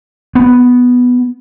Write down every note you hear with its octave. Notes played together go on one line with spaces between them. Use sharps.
B3